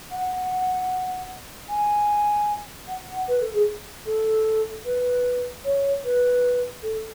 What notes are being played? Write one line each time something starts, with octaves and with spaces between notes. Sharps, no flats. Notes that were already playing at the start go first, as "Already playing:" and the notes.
F#5
G#5
F#5
B4
A4
G#4
A4
B4
C#5
B4
A4